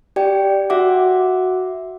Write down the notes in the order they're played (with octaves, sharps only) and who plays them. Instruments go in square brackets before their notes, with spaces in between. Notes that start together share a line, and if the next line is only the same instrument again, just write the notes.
[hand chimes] G4 D5 G5
F#4 E5 F#5 D6